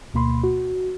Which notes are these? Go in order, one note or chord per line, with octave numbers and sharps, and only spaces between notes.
D2 B2 A#3 B5 C6
F#4